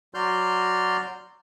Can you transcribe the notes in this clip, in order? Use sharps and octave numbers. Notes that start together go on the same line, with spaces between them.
F#3 F#4 D5 C6 F6 G6